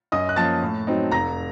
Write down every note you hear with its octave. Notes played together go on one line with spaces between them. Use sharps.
F#2 D#5 D#6
F#6
F3 A#3 C#4 A5 A6
A2
F#3 C4 D#4
F1 A#5 A#6